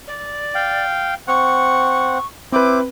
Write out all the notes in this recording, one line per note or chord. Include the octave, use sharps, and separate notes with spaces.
D5
F5 G5
C4 F#5 C#6
C4 E4 B4 C5 D6